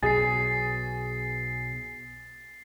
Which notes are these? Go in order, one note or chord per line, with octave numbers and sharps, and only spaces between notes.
B1 B2 G#4 A6 C7